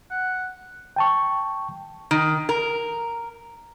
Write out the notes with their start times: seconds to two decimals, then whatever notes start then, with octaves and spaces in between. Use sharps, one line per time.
0.11 F#5
0.96 G5 A5 C#6
2.11 D#3
2.49 A#4